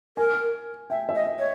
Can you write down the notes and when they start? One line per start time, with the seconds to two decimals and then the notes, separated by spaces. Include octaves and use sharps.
0.17 A#4 G#5
0.90 E5 G5
1.09 E5
1.15 D#5
1.27 D#5
1.39 C#5